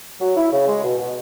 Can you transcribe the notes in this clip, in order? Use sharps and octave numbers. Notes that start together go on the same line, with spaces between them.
F#3
E4
C#3
G#3
B2
B2